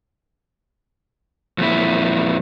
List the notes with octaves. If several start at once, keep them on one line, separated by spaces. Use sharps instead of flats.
F2 A#2 E4